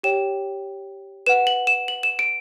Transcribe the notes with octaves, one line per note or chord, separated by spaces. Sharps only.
G4 C#5 G5 E7
B4 F#5 E7
F#7
E7
F#7
E7
D7